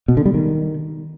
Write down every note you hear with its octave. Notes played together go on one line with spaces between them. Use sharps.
B2
D3
G3
D#3